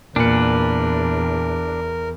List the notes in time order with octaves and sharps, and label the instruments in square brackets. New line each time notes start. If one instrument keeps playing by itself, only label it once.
[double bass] E2 [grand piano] A#2 C#7 [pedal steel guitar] D4 B4 [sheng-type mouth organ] A#4